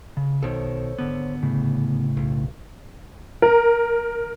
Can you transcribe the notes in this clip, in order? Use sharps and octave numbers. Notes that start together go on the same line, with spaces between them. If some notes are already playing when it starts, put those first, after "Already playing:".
C#3
B1 B2 D#3 A4 C5 C#5
G#1 D3 B3
A2 C#3
B1
A#4